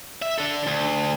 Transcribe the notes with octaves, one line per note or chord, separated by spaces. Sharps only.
E5
D4 A4
D2